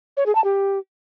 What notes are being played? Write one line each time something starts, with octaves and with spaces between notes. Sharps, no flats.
C#5
G#4
A5
G4